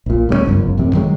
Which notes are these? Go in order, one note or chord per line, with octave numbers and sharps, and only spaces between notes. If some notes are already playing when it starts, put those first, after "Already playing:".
A#1 A#2
D2 G3 A#3 C#4
G1 C#2 F#2
A1 F#2 C3
D#3 F#3 G#3